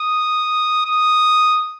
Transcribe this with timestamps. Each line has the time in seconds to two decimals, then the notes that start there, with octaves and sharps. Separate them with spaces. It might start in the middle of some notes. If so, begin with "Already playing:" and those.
Already playing: D#6
0.85 D#6